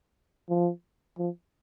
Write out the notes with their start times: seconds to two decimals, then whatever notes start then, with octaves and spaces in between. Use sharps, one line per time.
0.49 F3
1.18 F3